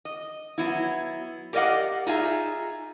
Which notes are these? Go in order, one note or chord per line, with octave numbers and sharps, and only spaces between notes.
D#5
F#3 B3 E4
G4 A#4 D5 D#5 F5 F#5
D#4 F4 G#4 E5 A#5